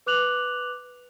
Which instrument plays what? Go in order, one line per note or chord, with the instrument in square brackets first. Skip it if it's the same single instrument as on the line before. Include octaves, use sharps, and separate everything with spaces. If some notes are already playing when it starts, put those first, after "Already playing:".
[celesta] B4 D6 F#6 F7 F#7